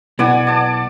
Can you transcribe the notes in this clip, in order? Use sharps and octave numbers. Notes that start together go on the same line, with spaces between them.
B1 B3 E4 D5 F#5 G#5
D5 A5